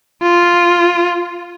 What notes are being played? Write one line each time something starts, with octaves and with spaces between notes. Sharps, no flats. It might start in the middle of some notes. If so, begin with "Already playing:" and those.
F4